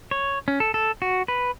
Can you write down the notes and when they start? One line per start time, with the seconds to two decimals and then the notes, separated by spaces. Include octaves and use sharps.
0.11 C#5
0.48 C#4
0.60 A4
0.74 A4
1.02 F#4
1.28 B4